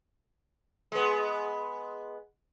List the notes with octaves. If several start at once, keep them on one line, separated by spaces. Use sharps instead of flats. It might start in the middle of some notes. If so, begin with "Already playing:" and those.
G#3 B3